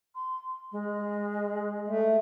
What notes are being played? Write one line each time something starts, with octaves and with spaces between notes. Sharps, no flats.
C6
G#3
A3